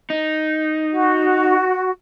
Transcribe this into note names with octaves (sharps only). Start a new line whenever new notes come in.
D#4
F#4